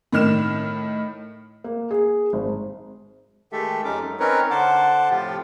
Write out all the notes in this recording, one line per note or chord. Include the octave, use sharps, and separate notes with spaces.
A2 D#3 F6 E7
A#3
G#4
G#1
D#3 G#3 A3 G4 A4 E5
F2 G#3 C#4 D#4 D6
F#2
C4 C#4 D#4 A#4 B4 C#5
D3 C5 F#5 A5 D6
A2 C3 F3 F4 G4